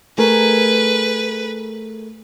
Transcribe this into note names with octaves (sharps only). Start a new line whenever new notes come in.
A3 G#4 A#4 B4